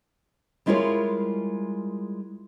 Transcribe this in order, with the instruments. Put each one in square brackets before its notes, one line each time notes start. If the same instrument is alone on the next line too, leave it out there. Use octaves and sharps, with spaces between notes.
[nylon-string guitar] G3 G#3 E4 F4 A#4 C#5